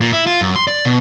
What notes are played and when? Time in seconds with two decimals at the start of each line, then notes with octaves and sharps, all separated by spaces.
0.01 A#2
0.13 E4
0.27 F4
0.41 F#2
0.56 C6
0.68 D5
0.85 B2